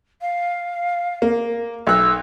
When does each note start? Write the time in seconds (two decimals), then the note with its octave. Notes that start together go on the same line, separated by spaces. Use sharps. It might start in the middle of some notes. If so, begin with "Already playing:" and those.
0.21 F5
1.22 A#3
1.87 B1 E6 F#6